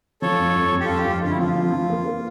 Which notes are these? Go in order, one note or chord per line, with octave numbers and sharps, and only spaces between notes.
F3 A4 C#5
F2
F2
F2
G4
F2 F4 A4
G4
F2 F4
D3 F4
E4
F3 F4
F3
F3
A#3
A#3